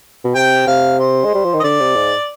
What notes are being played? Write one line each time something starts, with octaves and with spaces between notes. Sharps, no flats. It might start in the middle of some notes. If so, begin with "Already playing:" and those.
B2
C3 G5
C3 F5
C5
G#3
G3
F3
D#3
D#5
D3 D5
C3
G#2